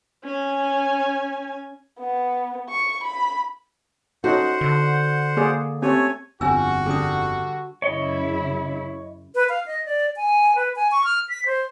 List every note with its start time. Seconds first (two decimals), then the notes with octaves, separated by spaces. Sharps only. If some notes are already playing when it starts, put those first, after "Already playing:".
0.25 C#4 G#5
1.99 B3
2.69 C#6
3.04 B5
4.24 C#4 D#4 F#4 A4 C5 F#5
4.61 D3
5.37 A#3 G#4 D5
5.82 A3 C4 C#4 G4 C#5 G#5
6.41 G1 F2 G3 E4 F#4 G#5 E6
6.86 D3 G3 G#4 D#6
7.82 F#2 C#3 E4 C#5 D#5
9.35 B4
9.49 F5
9.66 D#5
9.85 D5
10.16 G#5
10.55 B4
10.76 G#5
10.91 C#6
11.04 F6
11.29 B6
11.46 C5